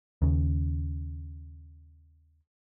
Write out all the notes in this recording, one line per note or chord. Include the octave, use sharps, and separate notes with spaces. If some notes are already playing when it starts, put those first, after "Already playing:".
D#2 C#3